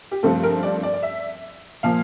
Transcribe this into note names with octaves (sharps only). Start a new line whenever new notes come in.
G4
G2 F3 A3 C4 A4
A#4
D5
D5
D5
E5
A#2 F3 A#3 F5